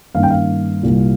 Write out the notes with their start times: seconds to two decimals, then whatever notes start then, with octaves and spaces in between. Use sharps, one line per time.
0.15 G2 D#3 A#3 C#4 F5
0.23 G5
0.30 F5
0.83 C2 A#2 G3 A#3